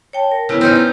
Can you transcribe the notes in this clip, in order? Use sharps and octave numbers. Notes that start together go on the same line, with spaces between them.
C#5 G5 A5
A#4
C#3 F#3 B3 E4 B4
C4 C#4 D#4
F4